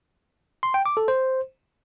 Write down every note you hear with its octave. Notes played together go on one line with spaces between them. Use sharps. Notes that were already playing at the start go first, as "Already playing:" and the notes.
C6
G5
D6
A4
C5